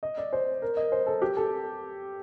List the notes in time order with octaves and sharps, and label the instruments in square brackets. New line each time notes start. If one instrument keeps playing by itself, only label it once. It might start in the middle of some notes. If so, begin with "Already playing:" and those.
[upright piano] D#5
D5
C5
A#4
D#5
C5
A4
G4
A4